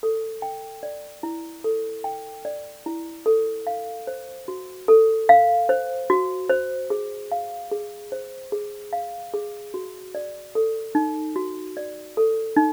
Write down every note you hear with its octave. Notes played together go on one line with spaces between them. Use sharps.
A4
G5
D5
E4
A4
G5
D5
E4
A4
F5
C5
F#4
A4
F5
C5
F#4
C5
G#4
F5
G#4
C5
G#4
F5
G#4
F#4
D5
A4
D#4
F#4
D5
A4
D#4